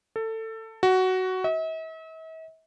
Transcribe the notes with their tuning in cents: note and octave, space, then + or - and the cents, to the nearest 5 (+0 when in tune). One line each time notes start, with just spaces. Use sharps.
A4 +20
F#4 +10
E5 -45